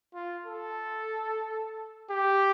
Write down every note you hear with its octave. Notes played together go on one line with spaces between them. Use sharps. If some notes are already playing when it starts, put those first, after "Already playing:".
F4
A4
G4